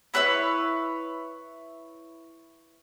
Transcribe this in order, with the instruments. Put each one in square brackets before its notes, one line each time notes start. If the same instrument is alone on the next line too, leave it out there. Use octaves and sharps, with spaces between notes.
[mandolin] E4 B4 C#5 E6